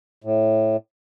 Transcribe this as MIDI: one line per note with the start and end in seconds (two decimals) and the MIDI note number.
0.24 0.77 45